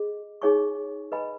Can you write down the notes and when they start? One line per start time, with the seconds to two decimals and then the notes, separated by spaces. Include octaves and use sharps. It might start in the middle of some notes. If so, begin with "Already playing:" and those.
Already playing: G#4 D#5
0.42 D#4 G#4 C#5 G#5 C#6
1.12 B4 D#5 G#5 B5